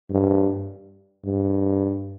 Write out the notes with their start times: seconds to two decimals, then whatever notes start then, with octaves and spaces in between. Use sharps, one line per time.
0.10 G2
1.25 G2